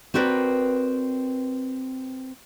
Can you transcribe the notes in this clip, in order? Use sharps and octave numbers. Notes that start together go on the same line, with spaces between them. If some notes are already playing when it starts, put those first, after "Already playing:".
C4 F#4 A#4 B4 D5